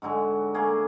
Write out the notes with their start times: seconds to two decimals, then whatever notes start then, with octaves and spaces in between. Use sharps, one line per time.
0.02 G#2 D3 F#3 G#3
0.54 A3 A#3 G#4